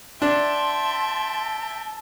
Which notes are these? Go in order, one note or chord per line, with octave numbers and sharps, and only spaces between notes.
D4 E5 G5 A5 C6